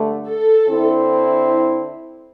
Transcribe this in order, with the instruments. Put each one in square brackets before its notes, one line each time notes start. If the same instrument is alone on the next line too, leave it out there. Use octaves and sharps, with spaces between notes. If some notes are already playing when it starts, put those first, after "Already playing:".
Already playing: [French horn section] G2 D3 A3
[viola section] A4
[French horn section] D3 C4 E4